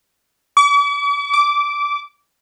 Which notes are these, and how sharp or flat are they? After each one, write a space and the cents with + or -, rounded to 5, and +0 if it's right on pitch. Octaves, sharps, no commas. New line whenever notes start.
D6 -45
D6 -15